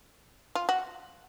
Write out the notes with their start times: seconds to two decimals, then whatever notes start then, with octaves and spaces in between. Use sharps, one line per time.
0.55 F4
0.69 F#4